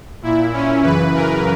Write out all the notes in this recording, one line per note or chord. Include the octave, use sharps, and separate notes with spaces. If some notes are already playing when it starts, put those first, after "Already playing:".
A#2 E4
C#4
F#2 C#3 E3 B4
A#4